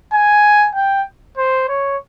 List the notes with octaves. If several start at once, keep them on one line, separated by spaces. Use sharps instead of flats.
G#5
G5
C5
C#5